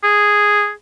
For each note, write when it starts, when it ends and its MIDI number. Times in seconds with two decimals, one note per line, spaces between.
0.04 0.71 68